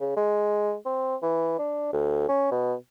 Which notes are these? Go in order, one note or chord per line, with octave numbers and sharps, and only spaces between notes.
C#3
G#3
C4
E3
D4
D2
C#4
B2